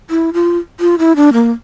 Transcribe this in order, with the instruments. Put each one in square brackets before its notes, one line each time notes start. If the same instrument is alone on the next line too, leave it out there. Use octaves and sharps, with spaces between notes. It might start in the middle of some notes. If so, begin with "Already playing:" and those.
[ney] E4
F4
F4
E4
D4
A#3